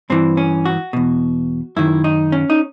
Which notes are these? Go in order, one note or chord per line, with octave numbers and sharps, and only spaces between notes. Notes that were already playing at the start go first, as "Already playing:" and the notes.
G2 E3 C4
C#4
F#4
E2 B2
F#2 D#3 E4
D#4
C#4
D#4